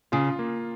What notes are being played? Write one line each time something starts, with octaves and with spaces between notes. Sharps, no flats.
C#3 F4
A#3